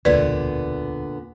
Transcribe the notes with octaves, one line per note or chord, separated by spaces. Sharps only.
E1 D2 A#2 D3 B3 B4 D5